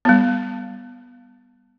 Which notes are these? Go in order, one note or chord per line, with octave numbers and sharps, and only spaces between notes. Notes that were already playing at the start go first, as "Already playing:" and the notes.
G3 B3